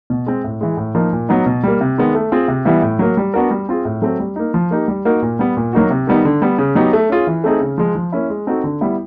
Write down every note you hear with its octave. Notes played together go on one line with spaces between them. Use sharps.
B2
G#3 C4
A2
E3 G#3
A2
F3 A#3 D#4
A#2
F#3 B3 D#4
B2
G3 A#3
C3
D#3 G#3 B3
A3
C4 F4 G#4
C3
E3 G3 B3 E4
A2
F#3 A#3
G3
B3 D4 F#4 A#4
G3
C4 F4 G#4
A2
F#3 A3 C4
G3
A#3 D#4
F3
A#3 D#4 G4
G3
A#3 D#4 F#4 A#4
A#2
G3 B3
A#2
F#3 A#3 D#4 F#4
C3
D#3 G3 B3 D#4
D3
G3 B3
C#3
F#3 B3 D#4 G4
A3
C#4 F4 G#4
E3
A3 C4 D#4 G#4
C#3
F3 G#3
F3
A#3 C#4 E4
G#3
C4 D#4 F#4 A4
D3
G3 B3 E4